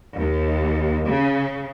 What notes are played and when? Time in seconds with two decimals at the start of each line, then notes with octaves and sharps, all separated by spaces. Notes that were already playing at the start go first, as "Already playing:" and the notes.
0.17 D#2
1.09 C#3